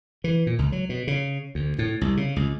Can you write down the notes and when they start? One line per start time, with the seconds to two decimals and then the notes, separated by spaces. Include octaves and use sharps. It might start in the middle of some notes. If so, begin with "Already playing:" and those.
0.24 E3
0.47 A#2
0.59 C#2
0.72 F#3
0.89 B2
1.07 C#3
1.55 D2
1.79 A2
2.01 C2
2.17 C#3
2.36 C#2